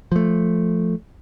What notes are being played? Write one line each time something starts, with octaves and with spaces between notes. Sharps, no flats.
F3 A3